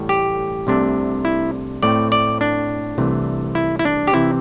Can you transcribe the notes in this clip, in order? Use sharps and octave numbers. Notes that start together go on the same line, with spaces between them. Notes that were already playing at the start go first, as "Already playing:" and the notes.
Already playing: A1 A2 G3
G4
C2 C3 A3 D4
E4
A2 A3 C4 D5
D5
D4
C2 C3 E3 A3
E4
E4
D4
G4
C3 E3 C4 E4